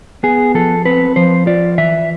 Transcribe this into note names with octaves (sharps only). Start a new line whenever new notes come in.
B3 G#4
F3 A4
C4 B4
F3 C5
F4 D5
E3 E5